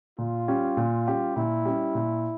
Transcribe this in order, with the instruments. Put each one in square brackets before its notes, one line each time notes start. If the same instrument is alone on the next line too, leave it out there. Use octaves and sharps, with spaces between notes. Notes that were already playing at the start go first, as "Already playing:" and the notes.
[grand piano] A#2 [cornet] F4
[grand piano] G3 C#4 G4
A#2
G3 C#4 G4
[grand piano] A#2 [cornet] E4
[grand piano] G3 C#4 G4
A#2